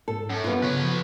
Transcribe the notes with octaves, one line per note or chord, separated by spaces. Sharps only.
G#2 A4
F#2
G2 B3 F4
C#3 B4 C#5
F3